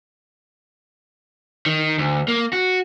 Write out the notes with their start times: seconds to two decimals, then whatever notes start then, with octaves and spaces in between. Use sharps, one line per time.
1.66 D#3
1.98 D2
2.28 A#3
2.53 F#4